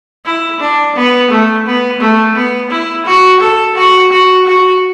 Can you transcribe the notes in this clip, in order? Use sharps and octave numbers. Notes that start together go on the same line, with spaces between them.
E4
D4
B3
A3
B3
A3
B3
E4
F#4
A4
F#4
F#4
F#4